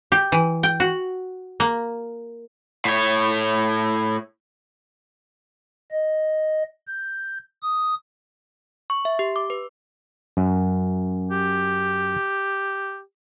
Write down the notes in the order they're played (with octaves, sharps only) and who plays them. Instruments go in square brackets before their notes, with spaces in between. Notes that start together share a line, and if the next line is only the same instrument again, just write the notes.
[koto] G4
E3
G5
F#4
A#3
[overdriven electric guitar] A2 C#5
[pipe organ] D#5
G6
D#6
[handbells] C#6
E5
G4
D6
B4
[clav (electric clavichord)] F#2
[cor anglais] G4